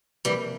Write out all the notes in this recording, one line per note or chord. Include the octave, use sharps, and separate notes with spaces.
C3 E3 F3 G3 A#3 F4 A#4